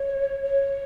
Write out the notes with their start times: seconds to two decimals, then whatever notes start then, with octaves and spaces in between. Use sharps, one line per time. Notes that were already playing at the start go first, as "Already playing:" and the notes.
Already playing: C#5
0.43 C#5